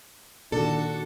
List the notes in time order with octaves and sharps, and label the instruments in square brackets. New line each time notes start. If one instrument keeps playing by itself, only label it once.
[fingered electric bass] A#2 D#3 [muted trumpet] D4 [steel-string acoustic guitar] F#4 A4